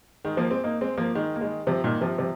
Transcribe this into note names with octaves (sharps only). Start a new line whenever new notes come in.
D#3 G#3
F3 A#3
G#3 C4
A#3 D#4
G#3 C4
F3 A#3
D#3 G#3
A#3
D#3 G#3
C3 F3
A#2 D#3
C3 F3
C3 F3